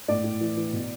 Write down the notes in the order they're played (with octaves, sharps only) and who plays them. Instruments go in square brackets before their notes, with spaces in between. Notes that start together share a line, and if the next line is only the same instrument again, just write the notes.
[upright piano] A2 D5
A2
E3
E3
B2